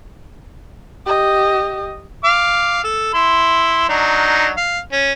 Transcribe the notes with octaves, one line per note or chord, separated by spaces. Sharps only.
G4 D#5
F5 D6
A4
E4 C6
F#3 D4 D#4
F5
C#4